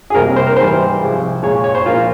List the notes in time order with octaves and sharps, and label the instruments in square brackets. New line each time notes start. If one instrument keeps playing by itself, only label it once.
[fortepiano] G#4
C2 C3 G3 A#3 A#4
C5
A#4
G#2 E3 G3 C5
C2 C3 F3 G#3
A#2 G#3 C#5
C#5
C5
A#2 F3 A#3 F4